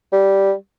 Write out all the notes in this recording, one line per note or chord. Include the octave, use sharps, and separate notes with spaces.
G3